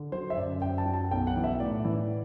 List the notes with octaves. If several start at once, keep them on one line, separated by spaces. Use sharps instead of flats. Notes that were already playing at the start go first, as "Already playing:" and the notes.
Already playing: D3
F#3 C5
E5
F#2 D5
F#2 G5
A5
F#3
A5
B1 G5
F#5
E3
E5
A2 D5
E3